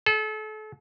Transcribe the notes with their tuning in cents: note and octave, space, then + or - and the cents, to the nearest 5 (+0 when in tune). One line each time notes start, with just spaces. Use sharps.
A4 -35